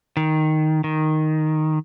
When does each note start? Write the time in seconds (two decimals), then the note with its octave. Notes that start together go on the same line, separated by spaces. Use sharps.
0.17 D#3
0.84 D#3